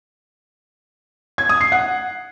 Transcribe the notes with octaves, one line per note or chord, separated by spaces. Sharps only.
G#6
D#6
C7
F#5